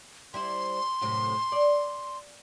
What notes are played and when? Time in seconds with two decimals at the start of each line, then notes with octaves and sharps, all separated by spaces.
0.34 G3 E4 C5 C6
1.01 F#2 A2 C3
1.52 D5